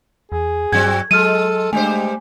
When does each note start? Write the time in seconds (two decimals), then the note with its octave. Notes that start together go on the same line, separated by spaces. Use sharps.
0.32 E2 G#4
0.72 G2 F#3 C4 F#4 G#6
1.11 F#3 G#3 A4 F6 D#7
1.73 G2 G#3 A3 G4 C5 G#5